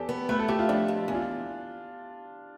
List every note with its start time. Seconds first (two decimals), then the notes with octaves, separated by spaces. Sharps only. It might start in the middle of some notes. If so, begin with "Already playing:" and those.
Already playing: E2 G4 A4
0.09 B3
0.29 A3 B4
0.39 A4
0.48 A3 G4
0.59 F4
0.69 F2 D4
0.88 F2
1.08 E2
1.15 F4